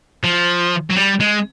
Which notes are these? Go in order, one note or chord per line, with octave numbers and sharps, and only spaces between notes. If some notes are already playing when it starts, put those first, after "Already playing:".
F3
F#3
G3
G#3